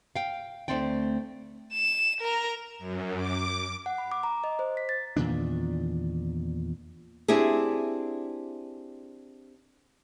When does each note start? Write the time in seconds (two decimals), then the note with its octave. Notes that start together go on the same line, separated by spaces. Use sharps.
0.16 F5 G5
0.68 D2 F3 A3 C4 D5 G5
1.73 E7
2.21 A#4 A#5
2.78 F#2
3.16 D6
3.86 F#5
3.98 B5
4.12 D6
4.23 A#5
4.44 D#5
4.59 C5
4.77 B6
4.89 A6
5.16 E2 A#2 D#3 D4
7.28 C4 D4 E4 G4 G#4